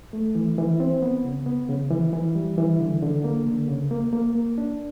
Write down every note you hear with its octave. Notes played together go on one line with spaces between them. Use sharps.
A3
E3
E3
C4
B3
C#3
B3
C#3
E3
E3
G3
E3
D3
D3
A#3
D3
C#3
A#3
A#3
A#3
D4